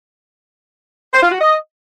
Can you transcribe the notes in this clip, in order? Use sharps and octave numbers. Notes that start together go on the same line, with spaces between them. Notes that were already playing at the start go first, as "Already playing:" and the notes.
C5
F4
F#4
D#5